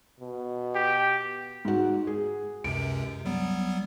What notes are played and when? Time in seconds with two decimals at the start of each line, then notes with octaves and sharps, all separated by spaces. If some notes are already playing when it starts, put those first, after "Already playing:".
0.20 B2
0.75 G4
1.65 G#2 F#4
2.07 G#4
2.64 C#2 F#2 C3 D7
3.25 F#3 G3 B3